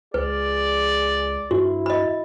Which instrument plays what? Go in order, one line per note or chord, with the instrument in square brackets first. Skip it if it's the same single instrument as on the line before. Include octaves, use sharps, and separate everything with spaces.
[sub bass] C#2 [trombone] G#4 [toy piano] B4 [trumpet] D5
[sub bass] G2 [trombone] E4 [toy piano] F#4
[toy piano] D#5 B5